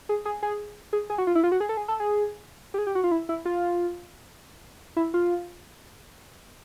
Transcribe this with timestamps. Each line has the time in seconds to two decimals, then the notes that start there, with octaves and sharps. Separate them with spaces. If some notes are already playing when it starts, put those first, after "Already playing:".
0.09 G#4
0.25 G#4
0.43 G#4
0.93 G#4
1.10 G#4
1.18 F#4
1.27 F4
1.35 E4
1.44 F4
1.52 F#4
1.60 G#4
1.69 A4
1.77 G#4
1.88 A4
2.00 G#4
2.74 G4
2.78 G#4
2.87 G4
2.95 F#4
3.04 F4
3.11 E4
3.29 E4
3.45 F4
4.96 E4
5.14 F4